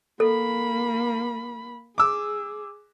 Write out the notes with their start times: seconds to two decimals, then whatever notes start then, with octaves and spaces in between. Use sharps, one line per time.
0.20 A#3 A4 B5
1.98 G#4 D6 E6